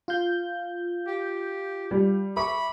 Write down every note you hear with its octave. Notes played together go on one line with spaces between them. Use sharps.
F4 F5 G6
G4
G3
E5 B5 C#6 D6